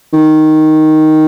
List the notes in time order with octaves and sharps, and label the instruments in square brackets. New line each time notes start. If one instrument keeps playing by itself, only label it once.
[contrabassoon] D#3